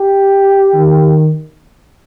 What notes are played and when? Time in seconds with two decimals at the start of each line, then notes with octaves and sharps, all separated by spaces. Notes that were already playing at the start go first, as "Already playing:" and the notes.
Already playing: G4
0.74 D#3